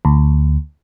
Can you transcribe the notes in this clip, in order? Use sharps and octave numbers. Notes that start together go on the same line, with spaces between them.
D2